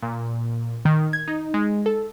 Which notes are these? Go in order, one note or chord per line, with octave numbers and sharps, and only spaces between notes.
A#2
D#3
G#6
D#4
G#3
A4